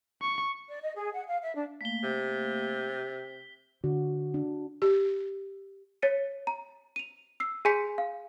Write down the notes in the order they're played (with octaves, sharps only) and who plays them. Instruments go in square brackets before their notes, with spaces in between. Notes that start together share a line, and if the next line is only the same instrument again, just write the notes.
[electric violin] C#6
[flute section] D5
D#5
G#4
F#5
F5
E5
D4
[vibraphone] A3 A#3 F5 [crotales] B6 G7
[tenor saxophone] C3
[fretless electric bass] D3 [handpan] F#4
[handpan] D4
[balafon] G4
[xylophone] C#5 A6 B6 C#7 D#7
A#5
D#7 F7
E6 C7
G#4 G#5 C6 G6 B6 C#7
F5